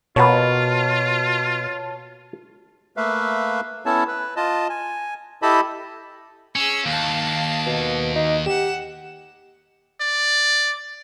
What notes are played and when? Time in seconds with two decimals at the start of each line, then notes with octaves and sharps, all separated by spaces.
0.16 B2 A#3 F4 F#4 B4 C#5 A5
2.97 A3 A#3 B4 E5 F5
3.86 B3 C#4 E4 A4 C#5 A5
4.08 B4
4.36 F4 D#5 A5
4.70 G#5
5.42 E4 G4 A4 D#5 A5 B5
6.56 C#4 G#4 E6
6.86 D#2 F5 A5
7.66 B2
8.16 D#4
8.46 G4 F#5 E7
10.00 D5